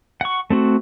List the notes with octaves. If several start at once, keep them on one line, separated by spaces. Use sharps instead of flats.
F#5 C#6
A3 C4 F#4